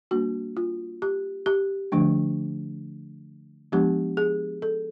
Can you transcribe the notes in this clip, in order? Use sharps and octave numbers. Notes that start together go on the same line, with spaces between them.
G3 A#3 D4 F#4
F4
G4
G4
D3 F3 A3 D4
F3 G#3 B3 D4 G4
G#4
A4